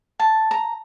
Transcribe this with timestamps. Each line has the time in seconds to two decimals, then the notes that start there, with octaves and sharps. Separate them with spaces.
0.19 A5
0.51 A#5